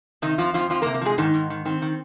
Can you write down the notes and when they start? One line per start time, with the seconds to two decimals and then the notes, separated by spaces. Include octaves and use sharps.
0.22 C3 D#3 D#4
0.38 F2 F3 F4
0.54 F2 F3 F4
0.70 F2 F3 F4
0.82 A#3 A#4
0.86 C3
0.94 A#3 A#4
1.01 F3 G#3 G#4
1.18 G#2 D#3 D#4
1.34 G#2
1.50 D#3
1.65 D#3 C4
1.82 D#3